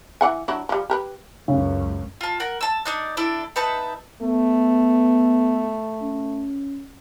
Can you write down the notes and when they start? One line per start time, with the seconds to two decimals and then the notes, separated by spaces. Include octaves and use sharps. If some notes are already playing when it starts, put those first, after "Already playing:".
0.21 E3 F#5 G#5
0.48 F#3 D4 E4
0.69 F3 G3
0.90 G4 A#4 B4
1.48 C#2 F#2 C#3
2.21 F4 A5
2.40 A#4 F#5
2.61 A5 E6
2.85 D4 D#4 F#6
3.17 D4 E4 A4
3.56 D#4 B4 E5 A5
4.22 A3 B3
6.02 C#4